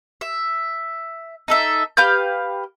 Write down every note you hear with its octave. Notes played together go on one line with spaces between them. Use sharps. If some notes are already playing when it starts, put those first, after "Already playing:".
E5
D#4 A4 E5
G4 B4 F5 G6